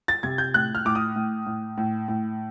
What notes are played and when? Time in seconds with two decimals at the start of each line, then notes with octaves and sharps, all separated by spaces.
0.08 A6
0.23 C3 G#6
0.38 G6
0.54 A2 F#6
0.75 F6
0.85 A2 D6
0.95 D#6
1.16 A2
1.47 A2
1.78 A2
2.08 A2